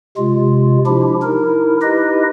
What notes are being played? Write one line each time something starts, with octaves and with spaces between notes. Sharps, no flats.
C3 G#3 F4
F3 D4 E4 G4
D#4 E4 A#4
D#4 E4 G4 B4 D#5